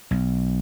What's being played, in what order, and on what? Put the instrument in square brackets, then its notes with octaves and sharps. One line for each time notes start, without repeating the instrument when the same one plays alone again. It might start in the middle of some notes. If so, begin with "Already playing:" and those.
[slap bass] B1